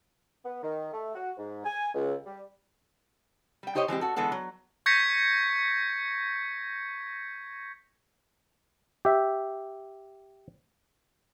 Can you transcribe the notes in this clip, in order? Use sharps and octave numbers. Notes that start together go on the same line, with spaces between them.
B3
D#3
A3
F#4
G#2
G#5
C#2
G3
G3 G5
D#4 G4 C5 C#5 D#5
E3 G#3 C4 G4
F#4 A4
D3 E3 G#3 B3 A4 F#5
F#3
C#6 G6 G#6 A#6 B6 C#7
G4 E5